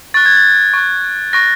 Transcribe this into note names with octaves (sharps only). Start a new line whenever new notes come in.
C#6 F#6 A6
G#6
A6
C#6 F#6
C#6 F#6 A#6